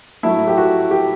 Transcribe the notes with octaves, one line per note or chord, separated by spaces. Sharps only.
A2 F#3 A3 E4
G4
F#4
G4